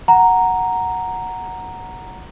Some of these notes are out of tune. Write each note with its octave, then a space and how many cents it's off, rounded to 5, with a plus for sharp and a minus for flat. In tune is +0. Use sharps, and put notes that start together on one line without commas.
F#5 +0 A#5 +0